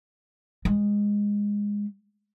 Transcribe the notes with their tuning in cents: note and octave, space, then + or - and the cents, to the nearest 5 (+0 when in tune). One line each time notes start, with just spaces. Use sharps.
G#3 -15